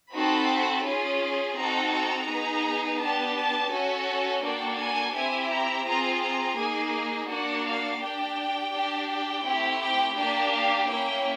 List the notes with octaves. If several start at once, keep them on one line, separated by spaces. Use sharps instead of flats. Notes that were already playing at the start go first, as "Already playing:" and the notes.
C4 D#4 F#4 A4 B5
C#4 F4 G#4
C4 D#4 F#4 A4 A#5
A#5
B3 D#4 G#4
B3 D4 G4 A5
A5
C#4 F#4 A4 G#5
A#3 D4 F#4 A4 G5
G#5
C4 E4 G4 G#5
A#5
C4 F4 G#4 A#5
A#5
A#3 D#4 G#4 G#5
A#3 D4 F#4 F#5
F5
D4 G4 G5
D4 G4
G5
A3 C4 E4 G4
G5
A#3 D4 G4 G5
F5
A#3 C#4 E4 G5